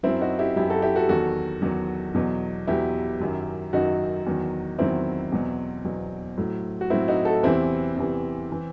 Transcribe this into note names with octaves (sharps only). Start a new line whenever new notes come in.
F#2 F#3 C4 E4
D#4 F#4
E4 G4
F#2 F#3 E4 G4
F#4 A4
E4 G4
F#4 A4
E2 D#3 F#3 F#4 A4
E2 D#3 F#3
E2 B2 F#3
E2 B2 F#3 E4 G4
F#2 D#3 F#3
F#2 D#3 F#3 D#4 F#4
E2 D#3 F#3
E2 D#3 F#3 C4 E4
E2 B2 F#3
E2 B2 F#3
A2 F#3
F#4
A2 F#3 C4 E4
D#4 F#4
F#4 A4
E2 C3 E3 C4 E4
E2 C3 E3
E3